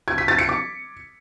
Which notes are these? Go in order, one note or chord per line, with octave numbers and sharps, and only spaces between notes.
G#6
B6
A6
C#7
D6